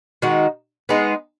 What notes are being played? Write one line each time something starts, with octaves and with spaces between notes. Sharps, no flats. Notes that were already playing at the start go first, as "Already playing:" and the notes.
D#3 G#3 D#4 F#4
G#3 B3 D#4 G#4